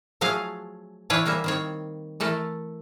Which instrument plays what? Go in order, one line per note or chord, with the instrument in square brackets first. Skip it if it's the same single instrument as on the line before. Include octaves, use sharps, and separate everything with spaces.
[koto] F3 F#3 A3 G#4 F5
E3 D4 B4 C#5 D5 F5
G3 A#3 C#4 E5
D#3 C4 C#5
E3 A3 A4 A#4